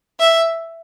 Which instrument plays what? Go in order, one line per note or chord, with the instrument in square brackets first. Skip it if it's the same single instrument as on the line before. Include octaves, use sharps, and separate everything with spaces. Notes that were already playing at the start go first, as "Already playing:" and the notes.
[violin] E5